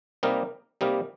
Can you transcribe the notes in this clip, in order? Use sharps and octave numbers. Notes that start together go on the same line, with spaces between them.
C3 G3 A#3 D#4 A#4
C3 G3 A#3 D#4 A#4